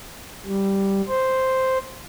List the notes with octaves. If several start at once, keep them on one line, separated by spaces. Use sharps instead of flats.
G3
C5